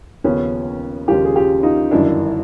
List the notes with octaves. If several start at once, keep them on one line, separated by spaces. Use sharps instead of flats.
D#2 C#3 F3 B3 C#4
D#2 C#3 F3 F4 G4
G#4
F4 G4
D#4 F4
G1 F#2 D#3 D4 E4